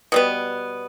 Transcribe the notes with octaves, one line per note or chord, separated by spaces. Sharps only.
B2 G3 B3